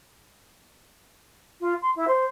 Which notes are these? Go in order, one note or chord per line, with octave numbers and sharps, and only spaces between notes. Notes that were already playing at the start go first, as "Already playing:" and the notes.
F4
C6
E4
C5